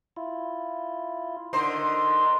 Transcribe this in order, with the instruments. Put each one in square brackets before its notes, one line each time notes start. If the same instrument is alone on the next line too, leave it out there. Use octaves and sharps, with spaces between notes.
[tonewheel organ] E4 F4
[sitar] D3 C5 [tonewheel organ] D#4 A#4 D#5